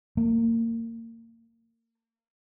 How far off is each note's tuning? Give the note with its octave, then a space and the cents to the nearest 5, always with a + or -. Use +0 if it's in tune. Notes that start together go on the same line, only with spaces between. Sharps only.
A#3 -30